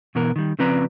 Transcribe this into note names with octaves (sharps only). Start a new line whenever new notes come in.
B2 E3 B3 A#4
D#3 G3
C#3 F3 C4 B4 D5 A#5